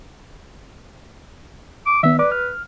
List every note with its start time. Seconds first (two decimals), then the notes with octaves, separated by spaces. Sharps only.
1.86 D6
2.03 D#3 B3 E5
2.19 B4 D5 D6
2.32 F6